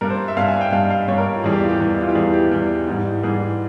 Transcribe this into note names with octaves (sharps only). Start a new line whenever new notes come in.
G2 G3 A#4
C5
E5
G2 G3 F5
G#5
G5
G2 G3 F5
F5
G2 G3 C#5
A#4
F4
E2 E3 G3 G#4
G4
F4
G4
E2 E3 G3
E4
F4
G4
E2 E3 G3 G#4
G4
E2 E3 G3
G#2 E3 G3
G#2 E3 G3 G#4